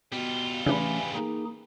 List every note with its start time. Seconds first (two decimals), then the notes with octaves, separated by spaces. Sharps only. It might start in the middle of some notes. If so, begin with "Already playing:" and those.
0.12 B2 G3 F4
0.66 C#3 E3 A3 C#4 D4 G#4 B4
1.15 A#3 D#4 G#4